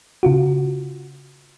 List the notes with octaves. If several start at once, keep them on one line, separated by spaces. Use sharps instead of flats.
C#3 F4 F#4